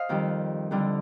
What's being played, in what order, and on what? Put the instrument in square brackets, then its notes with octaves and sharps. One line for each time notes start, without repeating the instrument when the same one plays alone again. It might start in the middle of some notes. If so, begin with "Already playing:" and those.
Already playing: [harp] C5 D#5 F5
F2 D#3 G3
F2 D3 G3